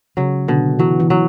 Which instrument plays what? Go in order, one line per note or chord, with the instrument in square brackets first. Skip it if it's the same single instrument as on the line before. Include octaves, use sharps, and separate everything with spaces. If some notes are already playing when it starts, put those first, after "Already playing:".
[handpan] C#3 [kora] F#3
[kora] B2 [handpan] D3
[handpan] E3 [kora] F#3
[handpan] E3
[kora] F#3